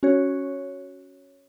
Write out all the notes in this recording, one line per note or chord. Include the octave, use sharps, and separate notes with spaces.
C#4 F#4 C#5